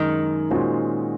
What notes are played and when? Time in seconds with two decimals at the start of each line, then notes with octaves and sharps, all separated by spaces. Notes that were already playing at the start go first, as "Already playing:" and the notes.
Already playing: F#2 D#3 G#3
0.51 A#2 G#3 C#4 F#4 C5